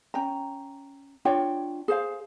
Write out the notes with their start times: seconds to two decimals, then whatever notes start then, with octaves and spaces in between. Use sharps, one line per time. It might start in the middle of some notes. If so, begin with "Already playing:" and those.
0.14 C#4 G5 A#5
1.25 D4 F4 C#5 G5
1.88 G#4 C5 F5